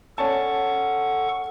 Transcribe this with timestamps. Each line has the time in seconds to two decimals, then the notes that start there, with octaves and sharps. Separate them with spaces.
0.18 C#4 A4 F#5 A5 C#6